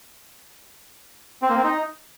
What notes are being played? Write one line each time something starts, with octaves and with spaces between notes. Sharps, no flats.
C4
A#3
C4
D#4